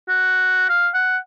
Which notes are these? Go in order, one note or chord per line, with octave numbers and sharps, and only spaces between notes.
F#4
F5
F#5